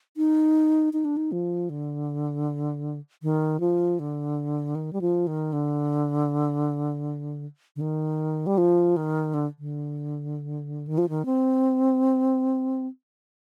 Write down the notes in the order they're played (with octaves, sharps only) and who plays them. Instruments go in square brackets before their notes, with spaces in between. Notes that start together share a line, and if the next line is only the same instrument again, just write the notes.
[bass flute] D#4
D#4
D4
D#4
F3
D3
D#3
F3
D3
D#3
G3
F3
D#3
D3
D3
D#3
G3
F3
D#3
D3
D3
D#3
F3
D#3
C4